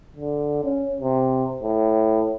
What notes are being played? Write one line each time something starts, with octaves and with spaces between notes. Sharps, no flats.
D3
C#4
C3
A2